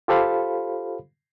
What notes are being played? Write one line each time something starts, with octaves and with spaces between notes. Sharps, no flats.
F4 G4 A4 C5 F5 B5